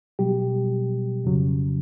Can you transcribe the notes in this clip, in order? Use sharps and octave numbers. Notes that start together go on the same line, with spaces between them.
B2 F#3 G3 G4
F2 C#3 F#3